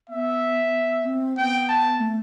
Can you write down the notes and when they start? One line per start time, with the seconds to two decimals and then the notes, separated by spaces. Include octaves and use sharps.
0.09 B3 E5
1.05 C4
1.37 B3 G5
1.69 A5
2.00 A3